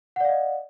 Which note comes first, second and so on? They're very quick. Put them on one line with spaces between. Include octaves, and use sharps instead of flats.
F#5 D5 F5 D#5